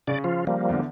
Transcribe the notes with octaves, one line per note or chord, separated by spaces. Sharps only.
C#3 D5
F3 F4
F3 G3 A#3
E2 D3